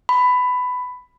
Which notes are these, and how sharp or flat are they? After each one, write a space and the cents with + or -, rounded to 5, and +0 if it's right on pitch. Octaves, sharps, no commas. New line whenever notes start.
B5 +15